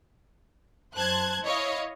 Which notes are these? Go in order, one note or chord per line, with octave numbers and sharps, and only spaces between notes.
F#2 C5 A5 F#6 G#6
E4 C#5 D#5 F5